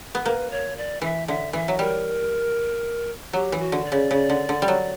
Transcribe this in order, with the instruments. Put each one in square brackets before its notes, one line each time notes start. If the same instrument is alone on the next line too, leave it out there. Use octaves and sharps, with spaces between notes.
[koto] B3
[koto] A#3 [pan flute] B4
[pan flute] C#5
D5
[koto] E3 [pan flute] E5
[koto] D3 [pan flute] E5
[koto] E3 [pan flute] E5
[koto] F#3
[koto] G3 [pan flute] A#4
[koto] F#3 [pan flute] G4
[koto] E3
[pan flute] F#4
[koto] D3
[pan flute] D5
[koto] C#3
C#3
D3
D3
G3
F#3